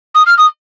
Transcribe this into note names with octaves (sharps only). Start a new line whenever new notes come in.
D#6
F6
D#6